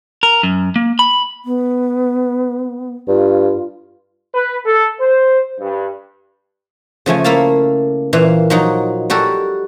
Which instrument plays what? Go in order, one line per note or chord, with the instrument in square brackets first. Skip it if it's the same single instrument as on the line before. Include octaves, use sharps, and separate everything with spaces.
[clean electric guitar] A#4
F#2
A#3
B5
[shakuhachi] B3
[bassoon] G2 [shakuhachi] F4
[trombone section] B4
A4
C5
G2
[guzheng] C#3 F3 A3 G#5
A3 A#3 E4 A4 F5 A5
A#2 E3 C5 F5
F3 F#3 D#4
G3 F#4 G4 A4 A#4